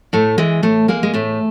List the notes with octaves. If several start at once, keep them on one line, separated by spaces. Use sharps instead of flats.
A2 A3
E3 G#3
A2 A3
G#3 A#3
G#3
A2 A3